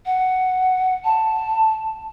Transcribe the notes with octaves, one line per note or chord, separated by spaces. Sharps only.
F#5
A5